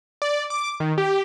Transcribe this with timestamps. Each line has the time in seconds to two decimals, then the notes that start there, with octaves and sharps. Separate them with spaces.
0.22 D5
0.50 D6
0.80 D#3
0.98 G4